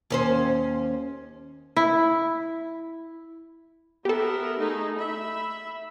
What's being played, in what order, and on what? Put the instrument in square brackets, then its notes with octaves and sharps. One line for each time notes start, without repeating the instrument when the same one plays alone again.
[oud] D#2 C#4 C5
[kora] E4
[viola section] B3 A#4 E5 [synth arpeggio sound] G4 A4
[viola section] A3 D#4 G#4
E5 B5